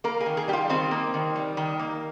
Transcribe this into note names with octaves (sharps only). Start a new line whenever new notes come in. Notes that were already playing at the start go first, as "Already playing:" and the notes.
A#3 A#4
G#4
D#3
G#4
G3 G4
F4
D#3 C4
A#3
D#3
G3
D#3
A#3